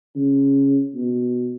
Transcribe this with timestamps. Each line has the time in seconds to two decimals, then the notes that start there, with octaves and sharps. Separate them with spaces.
0.16 C#3
0.94 B2